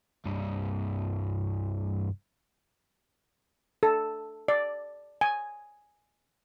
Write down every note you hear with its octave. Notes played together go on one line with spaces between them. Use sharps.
C2 G2
A4
D5
G#5